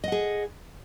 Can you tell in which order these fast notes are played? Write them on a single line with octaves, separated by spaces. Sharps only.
D#5 F#5 G#4